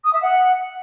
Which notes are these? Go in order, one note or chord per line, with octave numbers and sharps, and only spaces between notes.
D#6
E5
F#5